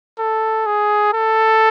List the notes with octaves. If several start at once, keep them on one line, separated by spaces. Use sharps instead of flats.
A4
G#4
A4